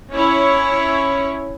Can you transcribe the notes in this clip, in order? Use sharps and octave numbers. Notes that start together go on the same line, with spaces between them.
C#4 E4 C#5